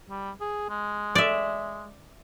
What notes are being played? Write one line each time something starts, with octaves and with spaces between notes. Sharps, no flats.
G3
G#4
G#3
D5 E5